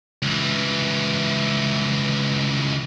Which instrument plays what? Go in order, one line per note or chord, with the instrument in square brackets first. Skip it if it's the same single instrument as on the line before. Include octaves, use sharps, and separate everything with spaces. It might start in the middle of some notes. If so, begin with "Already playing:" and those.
[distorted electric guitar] C#2 E3